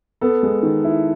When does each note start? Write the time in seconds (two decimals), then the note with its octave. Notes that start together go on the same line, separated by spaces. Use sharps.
0.21 B3 A4
0.43 G#3
0.63 D#3
0.84 E4